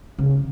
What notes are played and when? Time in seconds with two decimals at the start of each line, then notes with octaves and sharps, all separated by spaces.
0.18 C#3